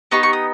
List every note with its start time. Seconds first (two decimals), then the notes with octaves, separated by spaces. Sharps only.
0.11 B3 D#4 G4 C#6
0.23 C#6
0.33 D#6